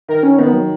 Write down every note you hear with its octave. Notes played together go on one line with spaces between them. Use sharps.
D#3 A#4
C#4
D#3 B3
F#3